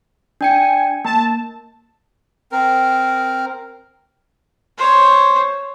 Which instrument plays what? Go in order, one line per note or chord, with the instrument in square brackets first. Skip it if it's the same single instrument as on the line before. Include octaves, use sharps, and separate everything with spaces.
[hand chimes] D4 G5 C#7 [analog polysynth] G#5
[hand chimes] A#3 [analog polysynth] A5
[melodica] C4 A#4
[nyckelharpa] C5 C#5